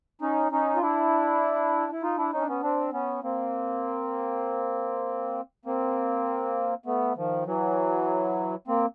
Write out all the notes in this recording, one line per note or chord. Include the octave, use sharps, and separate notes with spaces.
C#4 D#4
C#4 D#4
F4
D4 E4
E4
D#4 F4
D4 E4
C#4 D#4
D4
B3 C#4
C4 D4
B3 C#4
A#3 C4
A#3 C4
A3 B3
D#3 F3
E3 F#3
A#3 C4